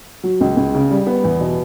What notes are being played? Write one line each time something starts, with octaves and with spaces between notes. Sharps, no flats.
F#3
C#2
C#2
C#3
G3
B3
E2
B2